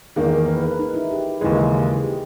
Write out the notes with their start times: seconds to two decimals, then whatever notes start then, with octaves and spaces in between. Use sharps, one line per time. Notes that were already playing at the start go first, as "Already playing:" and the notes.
0.16 E2 D#3 A#3 G#4
0.32 A#4
0.48 B4
0.63 B4
0.79 D#4
0.94 E4
1.10 G4
1.41 D#2 C#3 E3 G#3 G#4
1.57 G#4
2.04 G4